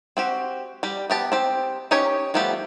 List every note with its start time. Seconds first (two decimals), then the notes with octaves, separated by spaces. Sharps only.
0.17 C4 F#4 G4
0.83 G3 G4
1.10 B3 G4 A5
1.32 C4 G4
1.91 C#4 D#4 G4 C#5
2.34 F3 G3 A3 B3 G4